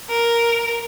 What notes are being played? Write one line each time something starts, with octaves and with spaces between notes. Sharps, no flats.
A#4